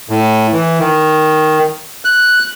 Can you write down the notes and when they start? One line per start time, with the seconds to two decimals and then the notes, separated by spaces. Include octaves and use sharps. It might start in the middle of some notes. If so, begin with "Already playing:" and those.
0.09 A2
0.53 E3
0.80 D#3
2.05 F#6